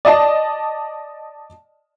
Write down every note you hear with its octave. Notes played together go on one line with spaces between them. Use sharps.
D5 D#5 A5